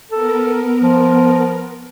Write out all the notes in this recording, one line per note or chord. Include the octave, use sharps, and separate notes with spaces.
B3 A4 A#4
F3